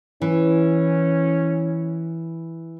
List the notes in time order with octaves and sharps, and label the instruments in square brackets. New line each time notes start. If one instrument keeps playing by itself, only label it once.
[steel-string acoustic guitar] E3 [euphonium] C#4